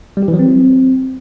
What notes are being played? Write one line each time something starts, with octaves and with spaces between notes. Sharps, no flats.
G3
G4
E3
F#3
C4